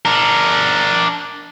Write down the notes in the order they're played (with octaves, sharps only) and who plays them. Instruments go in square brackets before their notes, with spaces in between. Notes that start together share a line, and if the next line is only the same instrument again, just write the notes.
[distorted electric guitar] D4 A#4